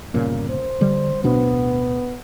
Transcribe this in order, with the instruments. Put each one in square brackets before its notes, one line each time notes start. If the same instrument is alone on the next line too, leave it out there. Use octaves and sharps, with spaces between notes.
[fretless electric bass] G1 A#2 C#3 [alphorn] A#3
[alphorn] C5
[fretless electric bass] D3 G3
[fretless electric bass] D1 B2 D4 [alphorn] B3